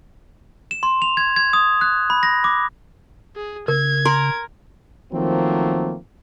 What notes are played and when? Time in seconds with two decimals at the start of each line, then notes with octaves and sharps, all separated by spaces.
0.71 E7
0.83 C6
1.02 F7
1.17 G#6
1.36 G#6
1.53 D#6
1.81 F#6
2.10 B5
2.23 A#6
2.44 D6
3.36 G#4
3.68 C#3 A#4 G#6
4.05 A#4 C6
5.13 D#3 F3 F#3 A3 A#3 C4